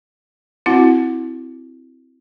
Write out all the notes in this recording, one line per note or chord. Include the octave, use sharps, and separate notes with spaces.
C4 E4 F#4 F#5